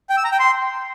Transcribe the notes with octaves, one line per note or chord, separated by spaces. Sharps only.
G5
E6
A#5
G5
C6